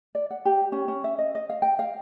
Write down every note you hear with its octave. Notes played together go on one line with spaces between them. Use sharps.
D5
F#5
G4
C#4
C#4
E5
D#5
D#5
F5
G5
F5